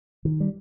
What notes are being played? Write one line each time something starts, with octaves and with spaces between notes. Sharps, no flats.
D#3
G3